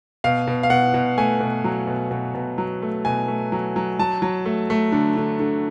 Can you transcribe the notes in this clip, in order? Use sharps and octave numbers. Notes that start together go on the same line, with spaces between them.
B2 F5
B2
F5
B2 F#5
B2
A3 G#5
B2
F#3
B2
B2
B2
F#3
A3
B2 G#5
A3
F#3
F#3
F#3 A5
F#3
A3
A3
D3
D3
D3